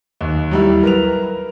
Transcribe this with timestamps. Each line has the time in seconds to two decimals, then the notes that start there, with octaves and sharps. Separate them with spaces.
0.21 D#2
0.51 F#3 G3 E4
0.83 A#4 B4 F7